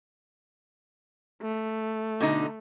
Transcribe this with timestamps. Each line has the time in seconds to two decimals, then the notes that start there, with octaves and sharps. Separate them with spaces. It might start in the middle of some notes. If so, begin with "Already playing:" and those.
1.42 A3
2.20 B2 D3 D#4